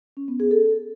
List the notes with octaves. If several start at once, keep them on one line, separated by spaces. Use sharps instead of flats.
C#4
B3
G#4
A4